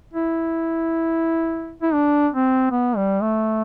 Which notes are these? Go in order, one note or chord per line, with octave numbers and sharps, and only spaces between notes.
E4
E4
D4
C4
B3
G3
A3